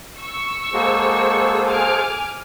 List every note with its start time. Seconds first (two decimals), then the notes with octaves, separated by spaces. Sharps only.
0.19 C#6 E6
0.74 G#3 A#3 F#4 G#4 A4 C5
1.65 G#5 D6 F6